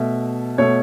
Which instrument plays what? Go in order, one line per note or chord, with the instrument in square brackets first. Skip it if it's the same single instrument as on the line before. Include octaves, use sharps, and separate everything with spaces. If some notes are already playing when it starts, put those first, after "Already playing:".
Already playing: [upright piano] B2 A3 E5
B2 A3 C#5